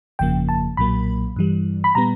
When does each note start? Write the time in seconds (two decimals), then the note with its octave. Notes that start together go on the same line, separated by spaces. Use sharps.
0.19 G1 F2 C#3 F3 A#3 G5
0.49 A5
0.77 B1 A#2 F#3 A#3 B5
1.36 G2 E3 G3
1.84 B5
1.95 A#2 G3 B3 A#5